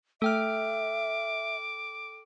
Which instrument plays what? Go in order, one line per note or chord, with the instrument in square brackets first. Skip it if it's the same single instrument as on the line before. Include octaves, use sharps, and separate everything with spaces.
[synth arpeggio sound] A3 [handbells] A4 G5 F6 [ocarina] E5 [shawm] D6